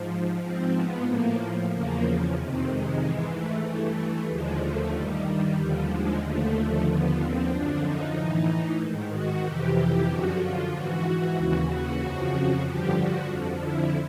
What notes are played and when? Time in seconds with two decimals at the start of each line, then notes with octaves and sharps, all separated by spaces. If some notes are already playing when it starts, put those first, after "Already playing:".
Already playing: G#2 F3
0.43 G#2 F3 C4
0.75 B3
1.07 A2 F3 A#3
1.71 E2 C#3 F3 A#3
2.36 F2 C3 D#3
2.69 G#3
3.00 G#2 E3 G#3
3.33 A3
3.65 G2 E3 A3
4.29 D#2 D3 F3 G#3
4.61 A3
4.93 G2 D#3 G3
5.25 G3
5.58 D#2 D3 F3
5.90 G#3
6.22 D#2 D3 F3 A3
6.86 D#2 D3 F3 B3
7.19 C4
7.50 F#2 D3 F3 D4
7.83 D#4
8.15 A2 E3
8.80 G#2 D#3
9.12 F#4
9.44 F2 C3 E3 G4
9.76 G4
10.08 F#2 D3 F3 F#4
10.40 F4
10.73 G#2 E3 F#4
11.36 D#2 C#3 E3
11.69 F#4
12.01 F2 C#3 F3
12.66 G2 D3 F3 G4
12.97 F#4
13.29 F2 D3 F3
13.62 E4